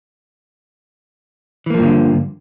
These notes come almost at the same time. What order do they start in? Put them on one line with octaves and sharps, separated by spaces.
E3 A#3 F3 G2 D3